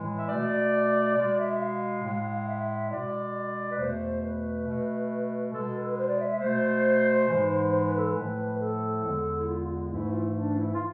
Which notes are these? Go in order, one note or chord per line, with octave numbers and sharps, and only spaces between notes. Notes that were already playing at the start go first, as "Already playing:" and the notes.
Already playing: A2 E3 G#3
E5
B2 A3 D5
B2 G#3 D5
E5
F5
A2 G#3
E5
E5
B2 G#3 D5
B4
E2 B2 A3 C5
B4
B2 A3
B2 G#3 A4
B4
B4
C5
D5
E5
E5
B2 A3 C5
G#2 E3 G#3
C5
B4
A4
B4
A2 F3 A3
A4
E2 D3 G#3
E4
F4
F4
G#2 E3 A3 E4
F4
E4
D4
E4
F4